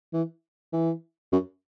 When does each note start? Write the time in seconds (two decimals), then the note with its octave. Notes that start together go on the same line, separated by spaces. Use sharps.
0.13 E3
0.73 E3
1.32 F#2